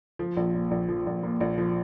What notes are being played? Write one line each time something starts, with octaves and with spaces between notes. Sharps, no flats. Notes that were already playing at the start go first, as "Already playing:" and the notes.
F3
A#1
A#2
A#1
F3
A#1
A#2
A#1
F3